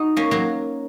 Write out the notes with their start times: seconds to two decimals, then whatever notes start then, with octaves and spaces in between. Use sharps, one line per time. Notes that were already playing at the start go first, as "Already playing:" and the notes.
Already playing: D#4 F#4
0.17 A#3 C#4
0.31 F#3 A#3